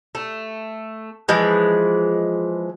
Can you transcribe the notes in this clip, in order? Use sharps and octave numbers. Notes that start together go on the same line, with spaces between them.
A3
E3 F3 G#3 B4